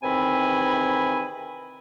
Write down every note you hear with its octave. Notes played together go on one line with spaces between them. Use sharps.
E2 C3 D#3 C4 G#5 B5